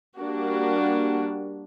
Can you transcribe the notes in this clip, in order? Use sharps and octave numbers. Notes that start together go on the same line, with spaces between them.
G3 A#3 D4 F#4